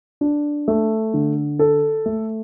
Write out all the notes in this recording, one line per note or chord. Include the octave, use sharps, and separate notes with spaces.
D4
A3
D3
A4
A3